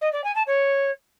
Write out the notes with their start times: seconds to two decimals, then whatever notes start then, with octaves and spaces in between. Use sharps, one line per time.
0.01 D#5
0.13 D5
0.24 G#5
0.36 A5
0.47 C#5